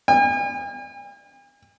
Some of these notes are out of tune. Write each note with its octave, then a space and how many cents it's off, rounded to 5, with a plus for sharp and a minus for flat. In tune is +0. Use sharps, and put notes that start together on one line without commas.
G#5 -45